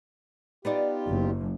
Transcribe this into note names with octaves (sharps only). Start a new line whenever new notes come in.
B3 D#4 F4 G4 D5
F#1